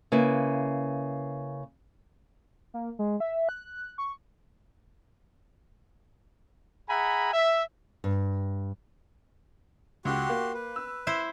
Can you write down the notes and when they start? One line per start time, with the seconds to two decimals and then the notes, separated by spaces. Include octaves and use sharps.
0.12 C#3 A#3 E4 B4
2.74 A#3
2.99 G#3
3.20 E5
3.49 F#6
3.98 C#6
6.89 G#4 E5 F#5 G#5 A#5 B5
7.34 E5
8.04 G2
10.05 C#2 F#4 G4 C6
10.29 A#3
10.54 B4
10.76 E6
11.07 E4 C5 E5